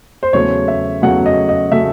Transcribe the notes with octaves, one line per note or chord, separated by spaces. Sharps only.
C5
E2 C#3 F#3 A3 C#5
E5
E2 C#3 F#3 A3 F#5
D#5
D#5
C#3 F#3 A3 E5